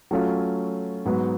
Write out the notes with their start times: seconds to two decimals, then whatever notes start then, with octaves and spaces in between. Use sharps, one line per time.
0.11 F#3 A3 C#4 F4
1.05 G#2 F#3 B3